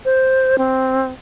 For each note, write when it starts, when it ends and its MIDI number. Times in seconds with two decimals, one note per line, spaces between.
0.05 0.56 72
0.58 1.11 60